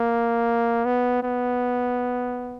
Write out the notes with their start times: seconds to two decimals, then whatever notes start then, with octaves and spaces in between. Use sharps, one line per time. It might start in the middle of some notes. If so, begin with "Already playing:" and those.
Already playing: A#3
0.85 B3
1.23 B3